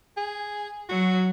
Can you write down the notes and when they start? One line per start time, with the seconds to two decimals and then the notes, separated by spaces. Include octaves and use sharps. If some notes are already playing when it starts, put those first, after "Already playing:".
0.17 G#4
0.89 F#3 F#4